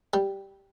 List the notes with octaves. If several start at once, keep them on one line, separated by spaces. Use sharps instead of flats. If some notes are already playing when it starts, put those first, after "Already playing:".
G3